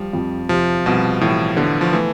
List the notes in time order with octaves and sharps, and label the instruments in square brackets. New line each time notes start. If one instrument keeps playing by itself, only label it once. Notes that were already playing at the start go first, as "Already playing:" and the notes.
Already playing: [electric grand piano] F3 [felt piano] G3
[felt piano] F2
[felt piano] C3 [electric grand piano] F3
[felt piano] C2 [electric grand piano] B2
[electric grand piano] A2 [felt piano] E3
[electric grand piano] D3 [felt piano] B3
[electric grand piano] F3
[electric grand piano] E3 [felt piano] A3